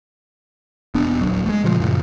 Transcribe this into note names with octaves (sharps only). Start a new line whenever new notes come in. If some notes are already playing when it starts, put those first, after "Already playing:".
E1 B3 D4
D#1 C#2 F#3
G#3 A3
A#2 C#3 F3
F#2 A#2 C#3